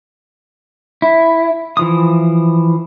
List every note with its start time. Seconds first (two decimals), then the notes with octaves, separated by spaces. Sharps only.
1.02 E4
1.77 E3 F3 D#6